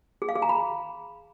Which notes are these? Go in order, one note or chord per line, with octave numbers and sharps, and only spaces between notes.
G#4
F5
G#4
A#5
B5